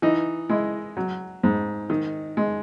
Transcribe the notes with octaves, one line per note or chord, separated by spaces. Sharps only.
E3 D#4
G#3 E4
F#3
G#2
D#3
G#3